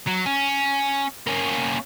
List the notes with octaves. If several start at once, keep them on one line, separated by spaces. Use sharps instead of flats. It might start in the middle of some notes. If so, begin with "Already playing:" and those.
F#3
C#4
A#3 C#4